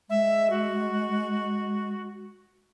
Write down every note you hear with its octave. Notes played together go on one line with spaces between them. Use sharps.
G#3 E5
F#4